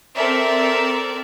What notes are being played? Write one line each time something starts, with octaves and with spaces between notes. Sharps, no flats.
C4 A4 A#4 D5 E5